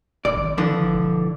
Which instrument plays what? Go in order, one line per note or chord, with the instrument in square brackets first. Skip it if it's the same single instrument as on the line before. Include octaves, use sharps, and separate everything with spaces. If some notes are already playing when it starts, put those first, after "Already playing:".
[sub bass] D1 [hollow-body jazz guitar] C2 D5
[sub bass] G#1
[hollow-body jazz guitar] D3 E3 F3
[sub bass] E1